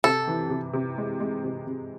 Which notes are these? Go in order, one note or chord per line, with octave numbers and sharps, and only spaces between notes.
C3 A4
E3
C3
C3
G#3
G#3
C3
C3